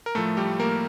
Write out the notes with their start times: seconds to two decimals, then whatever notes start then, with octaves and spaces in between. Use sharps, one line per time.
0.06 A#4
0.15 A2 F3 A3 A4
0.37 G3 G4
0.60 A#3 A#4